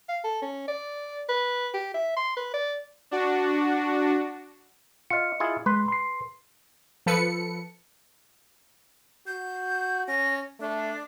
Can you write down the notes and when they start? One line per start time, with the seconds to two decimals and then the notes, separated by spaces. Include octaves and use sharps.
0.09 F5
0.24 A4
0.42 C#4
0.68 D5
1.29 B4
1.74 G4
1.94 E5
2.17 C6
2.37 B4
2.54 D5
3.11 D4 F#4
5.10 F4 D#5 F5 C#7
5.40 E4 F4 G#4
5.66 G#3 B4 C6
5.88 C6 C7
7.06 F3 A4 B4 C#7
9.27 F#4 G6
10.08 C#4 A#6
10.60 A3 D4